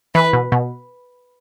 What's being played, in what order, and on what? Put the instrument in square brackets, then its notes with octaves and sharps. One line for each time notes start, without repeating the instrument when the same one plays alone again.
[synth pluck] E3 [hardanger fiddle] B4
[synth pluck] B2
B2